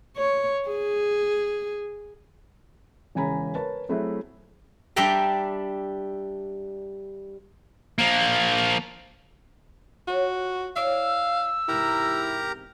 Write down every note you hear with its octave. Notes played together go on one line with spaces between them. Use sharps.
C#5
G#4
E1 C#3 C#4 G#5 A#5 B5
A#4 B4 C#5 A5
F#3 A3 C4 E4 F#4 G#4
G3 D4 D5 E5 G5 A#5
F3 A#3
F4 F#4 C#5
E4 C#5 D5 F5 E6
E2 G#2 C3 E4 G4 A#4 A#5